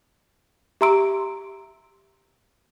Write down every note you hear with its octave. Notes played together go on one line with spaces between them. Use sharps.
G4 E5 A#5 C6 E6 D7